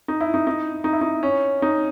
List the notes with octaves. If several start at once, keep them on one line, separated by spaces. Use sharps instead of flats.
D#4
E4
D#4
D#4
D#4
E4
D#4
C#4
D#4